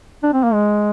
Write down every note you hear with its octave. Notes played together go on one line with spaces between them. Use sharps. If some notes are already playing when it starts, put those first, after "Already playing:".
D4
C4
A#3
G#3